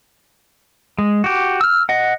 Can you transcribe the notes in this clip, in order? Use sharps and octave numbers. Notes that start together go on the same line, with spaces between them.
G#3
F#4 G4
E6 F6
D#5 F#5